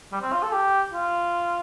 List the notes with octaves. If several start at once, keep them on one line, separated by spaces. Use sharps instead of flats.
G3
C4
F4
A4
G4
F4